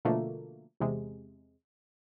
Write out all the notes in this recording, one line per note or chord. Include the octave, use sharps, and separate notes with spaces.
B2 D3 F3 A3 A#3
E2 C3 G#3